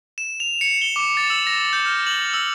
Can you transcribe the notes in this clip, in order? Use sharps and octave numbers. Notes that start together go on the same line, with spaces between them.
E7
F7
C#7
G7
D6
A6
E6
A#6
G6
F6
F#7
E6